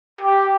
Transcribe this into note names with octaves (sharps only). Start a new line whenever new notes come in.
G4